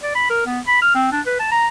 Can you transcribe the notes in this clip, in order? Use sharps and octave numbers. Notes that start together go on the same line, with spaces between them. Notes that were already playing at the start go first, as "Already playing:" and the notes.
D5
B5
A#4
B3
B5
F6
C4
D4
B4
A5
A#5